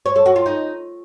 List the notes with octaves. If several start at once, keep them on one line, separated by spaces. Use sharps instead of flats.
C#5
A4
F#4
F4
D#4